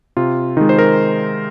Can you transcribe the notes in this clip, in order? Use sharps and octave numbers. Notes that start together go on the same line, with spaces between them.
C3 F4
D#3 G#3 D#4
C5
A#4